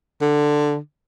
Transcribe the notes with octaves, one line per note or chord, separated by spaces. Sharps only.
D3